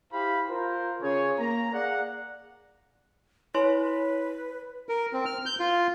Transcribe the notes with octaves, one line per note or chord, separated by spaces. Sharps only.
E4 G4 C5 F5 B5
F4 A#4 C5
C#3 G#4 C#5
A#3 A#5
G#4 D5 F5 F#5
E4 B4 C#5 C6
A#4
C4
F6
G6
F4